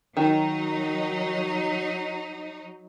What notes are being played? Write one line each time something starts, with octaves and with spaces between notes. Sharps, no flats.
D#3 F#3 D#4